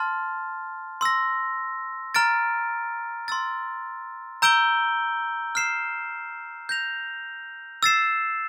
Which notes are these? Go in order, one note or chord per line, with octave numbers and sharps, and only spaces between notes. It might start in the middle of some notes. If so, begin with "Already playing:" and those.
Already playing: A5 C6 F6 A6
C6 E6 A#6
A#5 F6 A6 D7
C6 E6 A6
A#5 E6 G6 D7 G7
F6 C7 E7
G6 A#6 F7
E6 A6 C7 E7